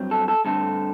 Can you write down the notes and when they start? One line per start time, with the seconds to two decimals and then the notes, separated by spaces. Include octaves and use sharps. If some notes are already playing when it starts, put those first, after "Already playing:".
Already playing: G2 F#3 C4
0.11 A4
0.28 A4
0.45 G2 D3 A3 C4 A4